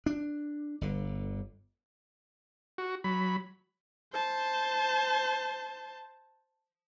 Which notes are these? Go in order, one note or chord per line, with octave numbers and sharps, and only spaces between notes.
D4
G1 D3
F#4
F#3 B5
C5 A5